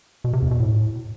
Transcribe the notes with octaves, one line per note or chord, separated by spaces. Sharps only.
B2
C3
E2
B2
A2